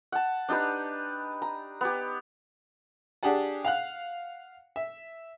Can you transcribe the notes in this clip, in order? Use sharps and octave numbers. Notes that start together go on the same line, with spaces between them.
F#5 A5
D4 D#4 G4 B4
A#5
B3 G4
D4 G4 G#4 F#5 A5
F5 F#5 F#6
E5